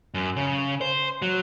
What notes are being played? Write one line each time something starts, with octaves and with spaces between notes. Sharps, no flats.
F#2
C#3
C5
F#3